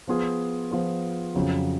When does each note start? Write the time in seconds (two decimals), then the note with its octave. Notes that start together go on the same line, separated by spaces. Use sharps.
0.08 F3 B3 F4 G#4
0.71 F3 B3 F4 G#4
1.35 F2 C#3 F#3